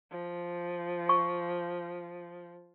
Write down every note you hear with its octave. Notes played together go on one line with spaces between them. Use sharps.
F3
C#6